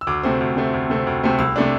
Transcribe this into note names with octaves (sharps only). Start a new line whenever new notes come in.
E6
D2 D6
C3 A3 C4
D2
C3 A3 C4
D2
C3 A3 C4
D2
C3 A3 C4
C2 E6
C3 A3 D4